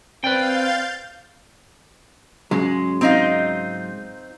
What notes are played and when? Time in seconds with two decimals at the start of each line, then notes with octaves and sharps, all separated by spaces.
0.24 C4 B4 D5 F5 G5 G6 A6
2.51 G#2 C#3 F#3 G#3
3.01 C4 D#4 F4